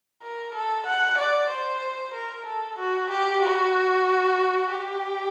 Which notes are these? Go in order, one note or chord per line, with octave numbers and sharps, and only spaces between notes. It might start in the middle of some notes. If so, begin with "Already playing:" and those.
A#4
A4
F#5
D5
C5
A#4
A4
F#4
G4
F#4
G4